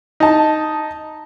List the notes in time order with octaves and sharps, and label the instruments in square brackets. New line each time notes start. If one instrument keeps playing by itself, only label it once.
[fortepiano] D#4 A5